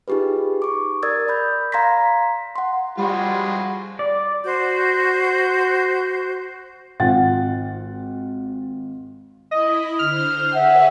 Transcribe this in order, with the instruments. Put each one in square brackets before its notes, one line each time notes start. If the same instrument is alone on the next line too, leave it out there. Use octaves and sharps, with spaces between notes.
[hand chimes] D#4 F4 G4 G#4 B4
C#6 D6
A#4 D5 D#6 E6 G#6 A6
D5 B5 G6
F5 A#5 C6 G#6 A#6 B6
F#5 C6
[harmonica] F3 G#3 F#4 [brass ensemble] G3 [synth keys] F#5 B5 C6
[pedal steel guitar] D5
[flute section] F#4 C5 G6
[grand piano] G#1 F4 F#5 A6
[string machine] E4 B5 [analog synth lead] D#5
[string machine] D3 C5 [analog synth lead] F6
[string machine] G#4 B4 C#5 [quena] E5 [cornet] F#5